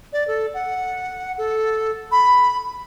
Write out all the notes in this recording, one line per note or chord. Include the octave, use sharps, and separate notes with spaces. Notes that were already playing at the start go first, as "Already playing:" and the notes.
D5
A4
F#5
A4
B5